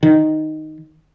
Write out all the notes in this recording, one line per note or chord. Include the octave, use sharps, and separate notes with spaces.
D#3